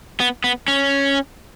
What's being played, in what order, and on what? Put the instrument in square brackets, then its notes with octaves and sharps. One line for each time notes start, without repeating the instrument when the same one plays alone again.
[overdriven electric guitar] B3
B3
C#4